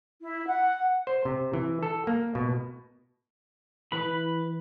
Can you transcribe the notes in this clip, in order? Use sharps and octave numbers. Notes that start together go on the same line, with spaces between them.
E4
F#5
C5
C3
E3
A4
A#3
B2
E3 B4 B5